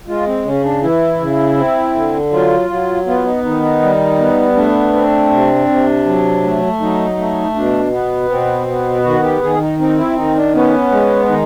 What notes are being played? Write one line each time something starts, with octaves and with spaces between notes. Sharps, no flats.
G#3 F4
C4
C#3 C#4
D4
E3 E4
C#3
C4
D3
F#3 F4
F#3
B3 F4
D#4
D#3 D#4
D#4
G3
B3
A3 D4
C4
C3
C3
F#3
A3
F#3 D#4
A3
B2 D4
B3
B2 C4
B3
D#3 F#4
G4
D#3 G#4
D#4
C4 D#4
E4
D#3 D#4
D4
B3 C#4
G#3
D#3 D#4